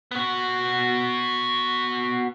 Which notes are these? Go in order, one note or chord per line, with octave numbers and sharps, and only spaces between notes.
B3 F#4